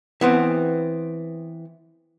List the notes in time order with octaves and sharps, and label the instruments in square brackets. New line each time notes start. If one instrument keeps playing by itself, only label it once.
[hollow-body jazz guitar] E3 B3 C4